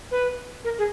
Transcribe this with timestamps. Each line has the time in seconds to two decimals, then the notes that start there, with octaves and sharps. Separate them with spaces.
0.11 B4
0.64 A#4
0.78 G#4